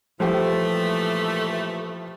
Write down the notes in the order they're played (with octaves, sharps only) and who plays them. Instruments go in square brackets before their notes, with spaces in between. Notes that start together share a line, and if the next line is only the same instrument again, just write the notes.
[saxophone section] A#2 E3 A3 [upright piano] F3 G3 G4